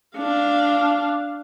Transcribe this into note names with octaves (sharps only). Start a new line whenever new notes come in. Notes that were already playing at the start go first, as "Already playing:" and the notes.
D4 F5